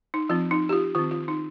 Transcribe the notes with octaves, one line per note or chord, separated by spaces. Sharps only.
D#4
F3 C4 F4
D#4
G4
F4
D#3 C4 F4
F4
D#4